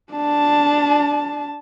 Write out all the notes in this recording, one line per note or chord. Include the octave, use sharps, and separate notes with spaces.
D4 A5